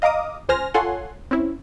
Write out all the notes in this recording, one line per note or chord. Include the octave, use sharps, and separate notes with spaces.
D#5 F5 A#5 D6 D#6
C#2 C5 G#5 F6 A#6
F4 A4 C#5 F#5 G#5 C6
C4 C#4 E4